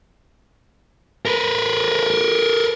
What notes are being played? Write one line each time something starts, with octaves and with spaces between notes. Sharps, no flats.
A#4 B4